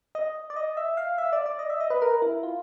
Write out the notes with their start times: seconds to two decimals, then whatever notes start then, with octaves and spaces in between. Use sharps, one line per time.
0.15 D#5
0.50 D5
0.56 D#5
0.77 E5
0.97 F5
1.18 E5
1.33 D5
1.46 D5
1.59 D#5
1.70 E5
1.80 D#5
1.90 B4
2.02 A#4
2.22 E4
2.43 F4